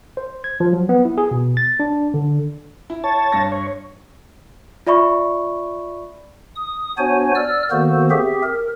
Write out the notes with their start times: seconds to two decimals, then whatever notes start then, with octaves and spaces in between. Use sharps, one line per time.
0.17 C5
0.44 G#6
0.60 F3
0.73 F#3
0.89 B3
1.05 E4
1.18 G#4
1.31 B2
1.57 A6
1.80 D4
2.14 D3
2.90 E4
3.04 C#5 A5
3.32 G2 A#6
3.52 C#5
4.87 F4 D5 E5 B5 C#6
6.55 D#6
6.98 B3 D4 F#4 C5 C#5 G#5
7.35 D5 E6 F6
7.71 D#3 A#3 B3 F#4 A4 C5
8.10 C4 G4 G#4 E5
8.43 A#4